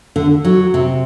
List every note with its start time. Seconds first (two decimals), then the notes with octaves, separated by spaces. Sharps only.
0.16 D3
0.45 F#3
0.74 C3